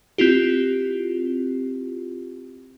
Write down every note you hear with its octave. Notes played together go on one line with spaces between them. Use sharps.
C4 E4 F4 G4